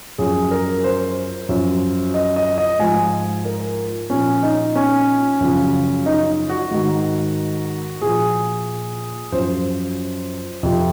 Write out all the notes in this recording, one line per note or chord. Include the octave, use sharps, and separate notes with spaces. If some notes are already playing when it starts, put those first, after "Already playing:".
F#2 F3 G#4
A#4
C5
F#2 F3
D#5
D#5
D#5
G#2 F3 G#5
A#4
A#2 F3 C#4
D#4
C#4
F#2 C#3 F3
D#4
F#4
G#2 D#3
A#2 F3 G#4
F#2 F3 C5
F2 C3 F3